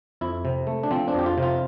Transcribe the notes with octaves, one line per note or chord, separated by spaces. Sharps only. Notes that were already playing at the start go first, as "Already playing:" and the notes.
F2 E4
C3
A3
D4
F3 C4
D4
F2 G4
F4
C3
F4